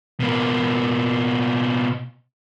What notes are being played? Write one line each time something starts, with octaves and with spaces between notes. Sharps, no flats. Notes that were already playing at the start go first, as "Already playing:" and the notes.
B2 A#3